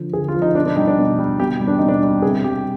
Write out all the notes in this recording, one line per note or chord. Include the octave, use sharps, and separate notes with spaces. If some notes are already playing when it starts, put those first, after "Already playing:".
Already playing: D3 F3
D3 G#4
F4
F3
D#4
B2 D4
D4
G3 D#4
D4
B2
G3
B2 G4
G3
D4
B2 D#4
D4
G3
C3 G#4
G3 G4